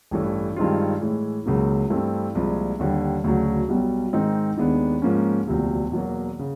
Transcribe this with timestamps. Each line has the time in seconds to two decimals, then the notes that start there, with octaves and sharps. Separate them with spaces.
0.11 A1 G2 E3 A3
0.56 G2 D#3 G#3 C4 F4
1.01 A2 E3 G#3
1.46 C#2 C#3 F#3 A#3
1.90 G2 E3 A3 C4
2.35 C2 A#2 F3 G#3
2.79 D#2 D3 G3
3.24 D2 C#3 F#3
3.69 B1 B2 G3
4.13 G#2 D#3 G#3 C4 D#4
4.57 D#2 D#3 G#3 B3 D4
5.02 G#2 F3 A#3 C#4
5.47 E1 D2 C3 F3
5.92 E2 B2 F#3 A#3
6.39 C#3